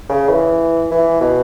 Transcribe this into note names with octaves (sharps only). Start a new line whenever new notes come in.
C#3
E3
E3
B2